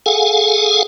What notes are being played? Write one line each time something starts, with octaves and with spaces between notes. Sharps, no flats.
G#4 A4 F5 F#5 G#5